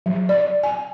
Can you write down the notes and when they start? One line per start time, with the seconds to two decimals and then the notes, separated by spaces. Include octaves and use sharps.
0.06 F#3
0.29 D5
0.63 G#5